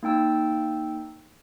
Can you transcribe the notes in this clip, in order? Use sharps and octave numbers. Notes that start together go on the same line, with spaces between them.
A#3 D#4 G5 E6